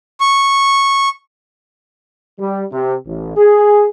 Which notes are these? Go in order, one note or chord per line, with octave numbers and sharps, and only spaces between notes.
C#6
G3
C3
A1
G#4